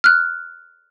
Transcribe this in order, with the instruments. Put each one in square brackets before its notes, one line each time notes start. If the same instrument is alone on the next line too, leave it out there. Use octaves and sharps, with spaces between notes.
[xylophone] F6 F#6